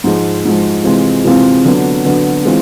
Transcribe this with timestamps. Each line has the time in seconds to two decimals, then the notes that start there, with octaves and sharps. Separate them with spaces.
0.04 G#2 F3 G#3
0.45 G#2 F3 G#3
0.84 C3 E3 G#3 C4 F4
1.25 C3 E3 G#3 C4 F4
1.65 D3 F#3 B3
2.05 D3 F#3 B3
2.45 E3 G#3 C4 F4